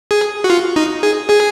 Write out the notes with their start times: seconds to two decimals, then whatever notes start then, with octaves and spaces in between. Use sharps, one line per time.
0.11 G#4
0.44 F#4
0.50 F4
0.76 D#4
1.03 G#4
1.29 G#4